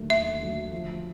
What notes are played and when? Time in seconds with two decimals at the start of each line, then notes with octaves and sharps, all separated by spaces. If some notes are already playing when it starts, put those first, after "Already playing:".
Already playing: D#2 D3 F#3 A3 D4
0.10 D#2 E5
0.41 D3 F#3 A3 D4
0.72 F3